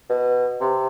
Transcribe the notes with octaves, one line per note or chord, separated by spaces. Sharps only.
B2
C3